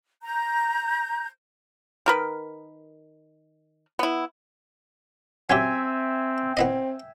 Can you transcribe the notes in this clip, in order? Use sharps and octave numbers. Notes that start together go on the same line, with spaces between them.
A#5 G6
D#3 A#4 B4
B3 E4
F#3 C4 C#4 G4 E5 G5 G#5
B3 C4 E4 D#5